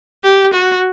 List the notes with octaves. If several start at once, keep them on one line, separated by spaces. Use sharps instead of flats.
G4
F#4